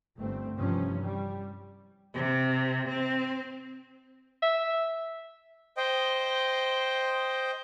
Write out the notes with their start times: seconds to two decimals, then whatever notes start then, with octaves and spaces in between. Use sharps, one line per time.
0.17 G1 A3 C4
0.57 G2 C3 E3 F3 C#4
1.01 G3
2.15 C3
2.89 C4
4.42 E5
5.77 C5 D#5 G5